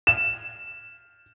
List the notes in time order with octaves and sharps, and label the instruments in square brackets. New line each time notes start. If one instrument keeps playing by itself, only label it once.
[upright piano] E7